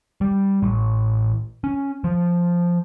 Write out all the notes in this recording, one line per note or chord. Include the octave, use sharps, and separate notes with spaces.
G3
A1
C#4
F3